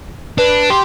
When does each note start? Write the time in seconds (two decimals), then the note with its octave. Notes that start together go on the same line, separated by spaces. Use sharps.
0.38 D4 B4
0.70 G4 C6